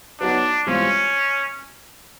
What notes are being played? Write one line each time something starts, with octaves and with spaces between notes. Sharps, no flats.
F#3 B3 D4 D#4 F#4
G#2 E3 G3 C4 C#4 F4